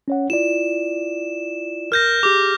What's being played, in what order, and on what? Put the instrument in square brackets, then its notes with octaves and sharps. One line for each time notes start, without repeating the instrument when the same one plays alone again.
[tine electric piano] C#4 C#5 F#5
[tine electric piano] E4 F4 D5 [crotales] E7
[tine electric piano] G#1 A#4 [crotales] F6 G6 A#6
[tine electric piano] G4 G#4 [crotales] D6